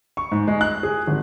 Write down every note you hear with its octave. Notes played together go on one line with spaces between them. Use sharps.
C#6
G#2
G#3
F#6
G#4
G#1